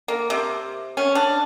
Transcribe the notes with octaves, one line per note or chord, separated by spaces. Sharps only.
A#3
C3
C#4
D4